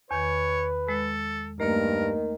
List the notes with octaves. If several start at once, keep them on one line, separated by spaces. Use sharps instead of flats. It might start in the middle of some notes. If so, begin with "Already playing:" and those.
E2 D#3 B4 C#5
G#3 A4
G2 D#3 A3 A#3 A#4